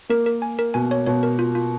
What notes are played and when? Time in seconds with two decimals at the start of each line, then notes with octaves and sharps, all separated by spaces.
0.09 A#3 A#4
0.26 A#4
0.42 G#5
0.59 A#4
0.74 B2 G#5
0.91 C#5
1.06 B2 C#5
1.23 A#4
1.39 F4
1.55 F4